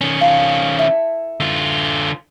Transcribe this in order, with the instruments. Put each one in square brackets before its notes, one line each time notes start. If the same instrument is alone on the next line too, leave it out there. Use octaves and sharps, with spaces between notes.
[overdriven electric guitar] D#3 C#4
[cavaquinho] F4 A4 B5
E4 A4 A5
[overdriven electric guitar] D3 F4